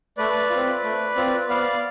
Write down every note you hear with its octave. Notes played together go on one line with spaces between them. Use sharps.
A3 B4 D5
C4 F4
A3
C4 F4
B3 D5 F5